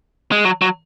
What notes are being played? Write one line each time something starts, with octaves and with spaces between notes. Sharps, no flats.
G#3
F#3
F#3